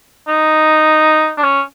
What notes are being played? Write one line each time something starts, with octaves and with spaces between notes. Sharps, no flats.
D#4
D4
C#4